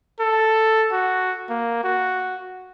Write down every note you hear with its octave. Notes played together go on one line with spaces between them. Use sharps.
A4
F#4
A#3
F#4